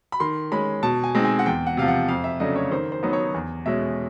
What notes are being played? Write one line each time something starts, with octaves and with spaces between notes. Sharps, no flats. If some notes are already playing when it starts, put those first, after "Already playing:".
B5
D#3 C6
G#3 C#4 B5
B2 A5
G#5
G#3 C4 D#4
G#5
F#5
E2 G5
F#5
C3 F3 F5
F#5
F2 F5
E5
C#3 F#3 A3 D4 D#5
C#5
D#3 C5
C5
F#3 B3 D#4
C#5
E2
B2 G#3 C#4 E5